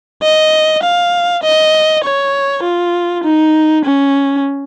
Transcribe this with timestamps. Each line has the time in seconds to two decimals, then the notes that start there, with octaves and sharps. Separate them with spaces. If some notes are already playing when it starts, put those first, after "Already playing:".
0.23 D#5
0.83 F5
1.43 D#5
2.04 C#5
2.64 F4
3.24 D#4
3.85 C#4